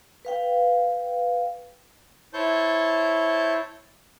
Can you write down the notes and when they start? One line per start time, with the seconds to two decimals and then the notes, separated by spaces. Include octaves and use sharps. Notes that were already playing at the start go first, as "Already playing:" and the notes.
0.25 B4 F5 G5
2.33 E4 C5 C#5 A5 G6